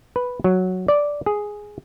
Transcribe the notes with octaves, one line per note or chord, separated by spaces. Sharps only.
B4
F#3
D5
G#4